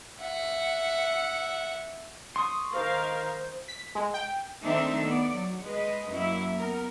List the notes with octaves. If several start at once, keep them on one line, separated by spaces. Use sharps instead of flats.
E5 F#5
C6 C#6 D#6
D#3 A#4 C5 F5
B6
G#3
G5
D#3 A3 C4 D4 D#4 E5
B3 D5
F#3
G#3 B4 D#5
F#2 F#3 A#3 E4
B3 A#4